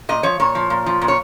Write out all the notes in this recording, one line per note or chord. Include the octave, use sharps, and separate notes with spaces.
A#2 D#5
F3 C#5
A#2 C#5
F3
A#2
F3
A#2
C#5